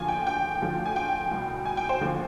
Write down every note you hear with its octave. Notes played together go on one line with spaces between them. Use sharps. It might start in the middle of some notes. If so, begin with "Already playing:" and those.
Already playing: D#2 D3 F3 G#5
G5
G5
D2 D3 F3
G#5
G5
C2 B2
G#5
G5
C5
D#2 D3 F3